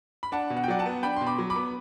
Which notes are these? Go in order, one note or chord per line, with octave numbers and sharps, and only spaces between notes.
B5
D4 F#5 A5
B2
F#5
G5
F#3 D5 F#5
F#5 A5
B3
D4 G5 B5
C6
B2
B5 D6
F#3
B5 D6
B3